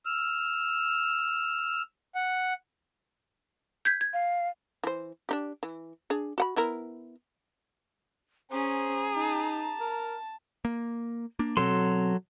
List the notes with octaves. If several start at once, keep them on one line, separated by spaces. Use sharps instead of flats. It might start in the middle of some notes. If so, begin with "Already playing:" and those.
E6 F6
F#5
G6 G#6 B6
G#6
F5
E3 C5
D4 D#4 G4
E3
D4 G#4
F#4 F#5 B5
B3 E4 A#4
C#4 G#4 C5 A#5
D#4 A5
A#4
A#3
A#3 D4
B2 F#3 C4 A4 C6